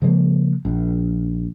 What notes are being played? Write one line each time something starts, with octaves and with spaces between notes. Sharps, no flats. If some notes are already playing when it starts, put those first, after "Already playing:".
C#3 F3 G#3 A#3
A#1